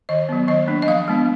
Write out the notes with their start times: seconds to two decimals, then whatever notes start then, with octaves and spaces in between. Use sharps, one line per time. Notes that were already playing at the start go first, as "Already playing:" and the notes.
0.09 D#3 D#5
0.29 F#3 B3
0.48 D#3 D#5
0.68 A#3 D4
0.82 D#5
0.88 F3 F5
1.08 G#3 B3 D4